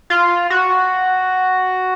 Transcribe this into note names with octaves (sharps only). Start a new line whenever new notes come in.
F4
F#4